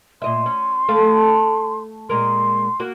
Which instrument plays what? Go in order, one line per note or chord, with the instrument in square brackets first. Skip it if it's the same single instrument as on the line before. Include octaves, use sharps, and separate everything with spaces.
[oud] A#2 D#5 E5 [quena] C6
[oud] C#4
A3 A4 F5
[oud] A#2 G#3 A#4 [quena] C6
[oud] A#3 F#4